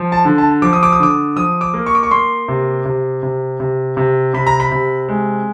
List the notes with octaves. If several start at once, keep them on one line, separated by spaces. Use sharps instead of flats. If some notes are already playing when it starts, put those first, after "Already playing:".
Already playing: F3
A5
D3
A5
F3 D6
D#6
D6
D#6
D3 D6
F3 D#6
D6
A#3
C#6
D6
C#6
A#3 C6
C3
C3
C3
C3
C3
C3 B5
A#5
B5
C3
G#3